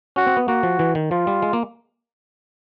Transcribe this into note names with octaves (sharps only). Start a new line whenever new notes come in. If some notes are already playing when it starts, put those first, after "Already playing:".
C#4 F#4
C4
B3
A#3 F#4
F3
E3
D#3
F3 F4
G3
G#3
A#3